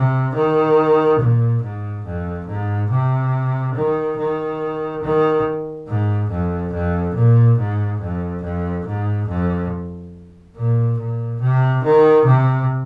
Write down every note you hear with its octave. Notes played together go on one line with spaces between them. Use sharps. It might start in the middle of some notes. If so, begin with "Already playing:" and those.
Already playing: C3
D#3
A#2
G#2
F2
G#2
C3
D#3
D#3
D#3
G#2
F2
F2
A#2
G#2
F2
F2
G#2
F2
A#2
A#2
C3
D#3
C3